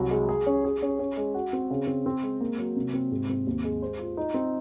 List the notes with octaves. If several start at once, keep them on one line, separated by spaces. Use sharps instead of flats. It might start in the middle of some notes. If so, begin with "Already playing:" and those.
Already playing: C2 F#3
G#3
G#4
C#4
G#4
C#4
C#4
G#3
F#4
C4
C#3
C4
C4
G#3
A#3
F#3
C3
C4
G#2
C4
D#2
G#3
C5
F4
D#4
C4